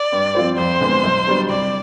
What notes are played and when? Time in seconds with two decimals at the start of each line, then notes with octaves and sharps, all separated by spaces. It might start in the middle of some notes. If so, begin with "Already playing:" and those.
Already playing: D5
0.12 G2
0.35 F3 C4 F4 C5
0.58 F2 C5
0.80 D3 G#3 B3
1.03 B1
1.27 B2 G3 D4
1.49 C2 D5